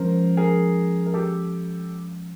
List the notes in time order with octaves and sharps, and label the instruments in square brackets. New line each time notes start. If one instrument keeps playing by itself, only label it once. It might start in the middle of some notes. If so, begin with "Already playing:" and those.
Already playing: [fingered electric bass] F3 G#3 C#4 [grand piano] A#4 C5
[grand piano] G#4 A#4
A#4
G4 A4